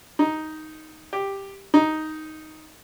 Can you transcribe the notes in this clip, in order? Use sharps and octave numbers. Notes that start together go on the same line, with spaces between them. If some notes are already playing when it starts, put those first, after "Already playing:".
D#4
G4
D#4